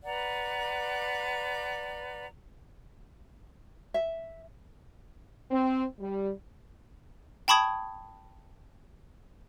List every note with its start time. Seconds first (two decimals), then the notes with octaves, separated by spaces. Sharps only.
0.04 B4 D5 F#5 A#5
3.94 E5
5.50 C4
5.99 G3
7.48 G5 A5 B5 C#6 D#6 G#6